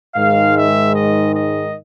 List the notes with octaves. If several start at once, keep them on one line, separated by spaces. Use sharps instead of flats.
G#2 D#3 G#3 F5
E5
D#5
D#5